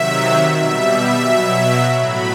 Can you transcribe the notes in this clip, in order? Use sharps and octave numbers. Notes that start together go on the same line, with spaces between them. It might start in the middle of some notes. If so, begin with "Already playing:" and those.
Already playing: C3 D#3 F#3 E5
B2 G3 E5
B2 F#3
A2 F#3 B5